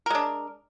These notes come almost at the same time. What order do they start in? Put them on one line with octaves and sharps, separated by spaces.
A#4 G#3 D4